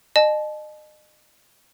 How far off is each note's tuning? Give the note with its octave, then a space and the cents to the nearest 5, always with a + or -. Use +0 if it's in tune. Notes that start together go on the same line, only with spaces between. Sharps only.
D#5 -35 A5 -35